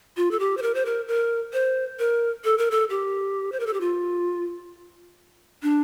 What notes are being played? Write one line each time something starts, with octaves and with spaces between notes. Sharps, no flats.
F4
A4
G4
C5
A#4
C5
A#4
A#4
C5
A#4
A4
A#4
A4
G4
C5
A#4
A4
G4
F4
D4